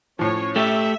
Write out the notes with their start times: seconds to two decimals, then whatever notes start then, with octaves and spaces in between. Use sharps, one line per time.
0.19 A2 F3 C#4 C#5
0.56 A3 G4 E5